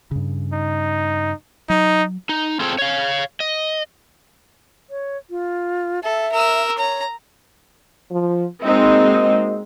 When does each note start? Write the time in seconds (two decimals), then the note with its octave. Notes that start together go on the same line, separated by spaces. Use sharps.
0.11 G2 C#3
0.53 D#4
1.70 F#3 D#4
2.29 D#4
2.60 C4 F4 G#4 A4 C5 G5
2.78 C#5 F5
3.40 D#5
4.90 C#5
5.30 F4
6.04 A4 E5
6.32 A#4 E6
6.78 C#5 A#5
8.11 F3
8.64 G#3 A#3 C4 D#4 F#4 D#5